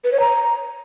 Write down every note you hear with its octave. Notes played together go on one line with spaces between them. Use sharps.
B4
C#5
A#5